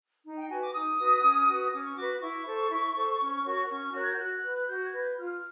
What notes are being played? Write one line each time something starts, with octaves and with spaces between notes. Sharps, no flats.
D#4
G5
F#4 B4 G#5
D6
D#4 D#6
F#4 B4
C#4
F#4 B4
C#4 D6
C#6
F#4 B4 D6
E4 C#6
A4 C5
E4
A4 C5
C#4
F#4 A#4 C#5
C#4 C#6
F6
F#4 A#4 C#5 F#6
G#6
G6
F#4 F#6
B4
F#4 G6
G#6
B4
G6
F4 F6